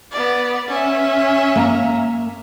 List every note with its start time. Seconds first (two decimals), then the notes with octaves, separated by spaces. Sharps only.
0.12 B3 D5
0.68 C#4 E5
1.56 A#3 A5 A#5